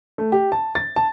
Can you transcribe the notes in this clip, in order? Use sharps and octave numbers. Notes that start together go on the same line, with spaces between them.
A3
G4
A5
A6
A5